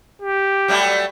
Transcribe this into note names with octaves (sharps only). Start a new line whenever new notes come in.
G4
F#3 G3 A3